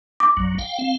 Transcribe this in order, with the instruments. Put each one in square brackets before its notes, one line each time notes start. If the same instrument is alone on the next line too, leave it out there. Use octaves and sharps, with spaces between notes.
[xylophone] D6
[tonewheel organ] A#1 F#2 F#3
F5 G5
C4 F5